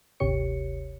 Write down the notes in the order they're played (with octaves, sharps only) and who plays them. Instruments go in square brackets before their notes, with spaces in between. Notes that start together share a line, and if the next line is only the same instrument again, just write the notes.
[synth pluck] G1 D2 C3 G4 C#5 C#7